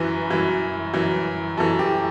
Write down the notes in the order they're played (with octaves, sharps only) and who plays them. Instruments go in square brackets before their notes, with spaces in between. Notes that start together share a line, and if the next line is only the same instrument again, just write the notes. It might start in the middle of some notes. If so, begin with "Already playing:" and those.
Already playing: [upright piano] F#2 E3 B4
F#2 E3
F#2 E3
F#2 E3 A4
G4